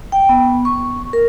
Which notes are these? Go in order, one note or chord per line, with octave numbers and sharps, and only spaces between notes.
G5
B3
C#6
A#4